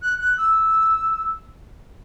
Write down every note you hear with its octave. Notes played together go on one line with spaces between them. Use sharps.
F#6
F#6
E6